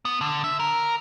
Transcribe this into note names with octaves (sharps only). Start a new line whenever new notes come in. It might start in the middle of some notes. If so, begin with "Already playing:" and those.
B3
D3
E5
A#4